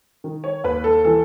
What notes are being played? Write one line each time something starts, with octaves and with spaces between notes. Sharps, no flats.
D#3
C#5
D#2 B4
A4
E3 A4